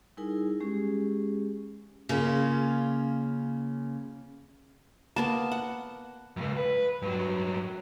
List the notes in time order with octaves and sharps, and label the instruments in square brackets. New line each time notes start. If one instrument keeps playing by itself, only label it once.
[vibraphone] G3 D#4 E4 G#4 A#4 G#5
G#3 C#4 G4 G#4
[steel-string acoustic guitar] C#3 A#3 C#4 F4
[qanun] A#3 B3 A#4 [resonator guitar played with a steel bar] A5
[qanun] F#5
[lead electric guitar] C#2 F#2
B4
G2 F#3